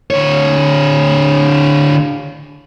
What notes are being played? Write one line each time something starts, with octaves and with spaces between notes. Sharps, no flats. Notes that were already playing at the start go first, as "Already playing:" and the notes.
D3 C#5